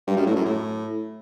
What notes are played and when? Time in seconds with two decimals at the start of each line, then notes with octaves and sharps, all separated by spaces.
0.07 G2
0.17 F#2
0.26 A2
0.36 F#2
0.46 A2